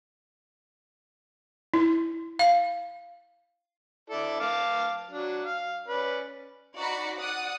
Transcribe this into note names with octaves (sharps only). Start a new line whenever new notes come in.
E4
F5
E4 A4 D5
F5 A5 D6
F#3 D4
F5
C#4 B4 D5
D#4 F#4 D5 B5 C#7
D5 F#5 D#6